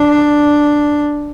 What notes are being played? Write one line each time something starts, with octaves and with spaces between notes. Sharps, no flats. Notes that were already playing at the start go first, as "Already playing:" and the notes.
Already playing: D4